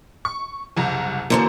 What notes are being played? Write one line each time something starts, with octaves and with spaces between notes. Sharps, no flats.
C#6
F#1 C2 A#5
F#2 D3 E3 A#3 C5 C#7